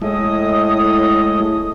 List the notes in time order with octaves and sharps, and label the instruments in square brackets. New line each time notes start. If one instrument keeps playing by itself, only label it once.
[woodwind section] A2 D#5 D#6 [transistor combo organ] G#3 A3 E4